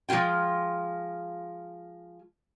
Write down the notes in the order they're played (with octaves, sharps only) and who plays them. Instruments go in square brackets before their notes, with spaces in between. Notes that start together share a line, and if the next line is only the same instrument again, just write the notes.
[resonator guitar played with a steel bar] F3 G#3 E4 F4 G5